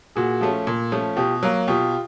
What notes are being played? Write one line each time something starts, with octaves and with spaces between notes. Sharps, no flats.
A#2 F#4 G#4
F3 A3 C#4
A#2
F3 A3 C#4
B2 F4 G4
F#3 A#3
B2 F4 G4